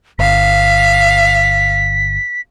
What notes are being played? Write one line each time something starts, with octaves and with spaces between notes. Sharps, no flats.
G1 F5 B6